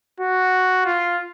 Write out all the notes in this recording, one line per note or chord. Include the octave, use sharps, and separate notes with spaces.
F#4
F4